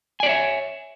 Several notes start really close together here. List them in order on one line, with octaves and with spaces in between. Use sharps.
G#5 D5 C#5 E5